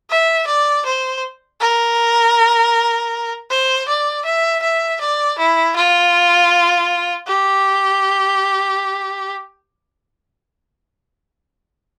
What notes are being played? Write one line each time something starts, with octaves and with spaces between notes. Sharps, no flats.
E5
D5
C5
A#4
C5
D5
E5
E5
D5
E4
F4
G4